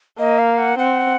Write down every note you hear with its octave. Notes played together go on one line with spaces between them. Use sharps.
A#3 D#5
F5
F#5
C4 F#5